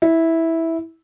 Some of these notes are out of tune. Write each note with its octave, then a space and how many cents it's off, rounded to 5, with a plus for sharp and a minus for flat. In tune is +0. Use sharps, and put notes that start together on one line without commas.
E4 -10